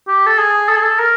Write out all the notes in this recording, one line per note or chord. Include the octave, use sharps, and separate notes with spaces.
G4
A4
G#4
A4
G#4
A4
A#4